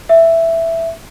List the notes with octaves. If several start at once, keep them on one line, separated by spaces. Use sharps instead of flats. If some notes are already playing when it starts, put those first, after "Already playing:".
E5